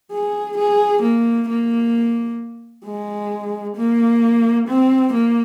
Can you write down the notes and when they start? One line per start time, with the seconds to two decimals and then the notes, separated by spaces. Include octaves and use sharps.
0.12 G#4
0.58 G#4
1.03 A#3
1.49 A#3
2.85 G#3
3.77 A#3
4.68 C4
5.14 A#3